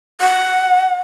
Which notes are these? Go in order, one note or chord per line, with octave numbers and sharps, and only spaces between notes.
F#5